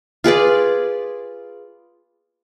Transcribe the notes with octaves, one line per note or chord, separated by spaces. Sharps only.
F4 G#4 B4 D5